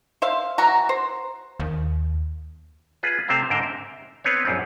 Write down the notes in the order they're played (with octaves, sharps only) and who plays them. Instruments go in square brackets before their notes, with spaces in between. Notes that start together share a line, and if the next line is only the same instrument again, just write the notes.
[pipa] C5 E5 F5
E3 F#3 F#4 A#5
C5
[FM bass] D#2
[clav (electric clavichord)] F4 G#4 B4
C3 A3 C4 C5 F5 A#5
G#2 D3 A#4 C5 G5
E5
B3 C4 B4 C#5
A#1 F#2 G3 C4